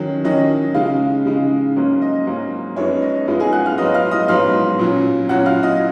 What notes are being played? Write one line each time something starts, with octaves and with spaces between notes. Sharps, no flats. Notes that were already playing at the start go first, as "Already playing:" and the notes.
Already playing: D#3 F#3 C#4
D#3 F#3 C#4 D#5
C#3 G#3 D#4 F4 F5
C#3 G#3 D#4
G#2 F#3 A#3 C#4
D#5
G#2 F#3 A#3 C#4
F#2 F3 G#3 B3 D#4 C#5
D#5
F#2 F3 G#3 B3 D#4 F4 F5
G#4 G#5
F#5 F#6
F5 F6
G#2 F#3 B3 D#5 D#6
F5 F6
D#5 D#6
G#2 F#3 B3 F5 F6
A#2 F#3 C#4
A#2 F#3 C#4 F#5 F#6
F5 F6
D#5 D#6